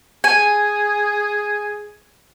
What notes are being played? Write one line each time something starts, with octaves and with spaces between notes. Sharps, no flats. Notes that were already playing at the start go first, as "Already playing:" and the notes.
G#4 G#5